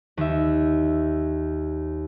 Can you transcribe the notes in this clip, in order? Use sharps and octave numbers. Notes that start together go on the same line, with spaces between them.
D#2 E5